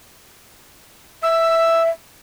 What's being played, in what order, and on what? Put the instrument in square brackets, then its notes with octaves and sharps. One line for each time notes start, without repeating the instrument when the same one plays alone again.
[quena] E5 [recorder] E6